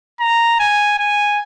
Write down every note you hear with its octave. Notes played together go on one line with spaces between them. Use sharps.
A#5
G#5
G#5